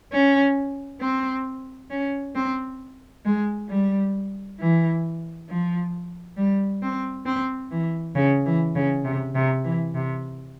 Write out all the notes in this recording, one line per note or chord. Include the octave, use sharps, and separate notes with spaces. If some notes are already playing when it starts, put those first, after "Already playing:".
C#4
C4
C#4
C4
G#3
G3
E3
F3
G3
C4
C4
E3
C#3
E3
C#3
C3
C3
E3
C3